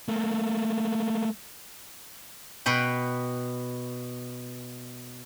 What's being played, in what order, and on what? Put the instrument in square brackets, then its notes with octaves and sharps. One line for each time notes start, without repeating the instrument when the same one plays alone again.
[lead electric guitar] A3 A#3
[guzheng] B2 B4 G5